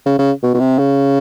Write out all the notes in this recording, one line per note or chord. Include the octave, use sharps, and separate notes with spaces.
C#3
C#3
B2
B2
C3
C#3